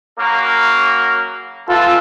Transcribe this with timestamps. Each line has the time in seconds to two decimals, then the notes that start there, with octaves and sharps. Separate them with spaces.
0.19 C#3 F#3 A#3
1.69 D3 E3 F4 A4